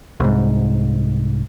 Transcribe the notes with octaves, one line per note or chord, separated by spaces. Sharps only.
C2 G#2